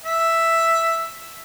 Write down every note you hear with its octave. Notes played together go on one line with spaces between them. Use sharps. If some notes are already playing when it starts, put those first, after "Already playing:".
E5